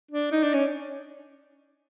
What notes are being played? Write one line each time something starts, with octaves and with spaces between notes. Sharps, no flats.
D4
D#4
D4
C#4